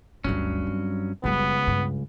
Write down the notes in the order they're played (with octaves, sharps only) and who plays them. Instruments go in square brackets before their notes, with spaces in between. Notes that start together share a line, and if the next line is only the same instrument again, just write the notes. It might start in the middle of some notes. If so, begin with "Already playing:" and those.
[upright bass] G1 D2 [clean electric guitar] G2 F#3 C#4
[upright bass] C4
[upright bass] F#1 G3 [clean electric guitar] C#2 [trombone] B3
[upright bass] G2